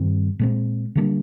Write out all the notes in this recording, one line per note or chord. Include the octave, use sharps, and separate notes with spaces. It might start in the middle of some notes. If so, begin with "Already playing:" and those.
Already playing: G2 D#3 G3 C4
A#2 G#3 C4
D3 G3 A#3 D4